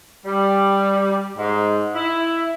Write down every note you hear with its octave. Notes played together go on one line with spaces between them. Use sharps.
G3
G#2
E4